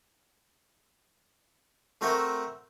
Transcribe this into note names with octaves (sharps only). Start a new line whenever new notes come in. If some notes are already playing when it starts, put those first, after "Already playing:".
A3 C4 F#4 A#4 C5 E5